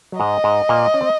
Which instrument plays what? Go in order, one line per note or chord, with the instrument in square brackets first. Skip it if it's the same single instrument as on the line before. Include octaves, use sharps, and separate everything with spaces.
[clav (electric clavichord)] F#3
[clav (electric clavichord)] G#2 G#3 [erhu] D#5
[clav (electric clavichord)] G#2 G#3
A#2 A#3
C#4
C4